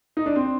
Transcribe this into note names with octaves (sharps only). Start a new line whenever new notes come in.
D#4
D4
C4